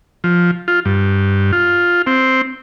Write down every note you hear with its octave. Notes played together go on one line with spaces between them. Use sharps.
F3
F4
G2
F4
C4